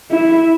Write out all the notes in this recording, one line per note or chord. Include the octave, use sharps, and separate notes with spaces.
E4